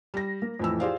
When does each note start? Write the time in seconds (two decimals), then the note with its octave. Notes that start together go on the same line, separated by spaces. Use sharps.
0.14 G3 A#6
0.42 A#3
0.59 F2 A2 E3 E4 E6
0.80 F4 G4 G#4 C5 D5 F5